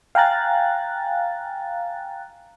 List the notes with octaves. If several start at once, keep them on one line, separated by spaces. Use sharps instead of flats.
F5 G5 G#5 A#5 F#6 A6